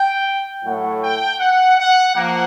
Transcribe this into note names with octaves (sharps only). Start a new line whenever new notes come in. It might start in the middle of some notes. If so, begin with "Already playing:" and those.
Already playing: G5
A2 F#3 A3 F#5
G5
F#5
F#5
F3 A#3 F#5